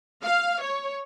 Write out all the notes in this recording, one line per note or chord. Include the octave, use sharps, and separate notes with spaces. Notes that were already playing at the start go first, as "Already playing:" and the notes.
F5
C#5